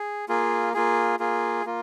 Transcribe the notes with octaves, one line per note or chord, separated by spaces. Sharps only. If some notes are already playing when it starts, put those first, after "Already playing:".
Already playing: G#4
A#3 F4 G#4
A#3 F4 G#4
A#3 F4 G#4
A#3 F4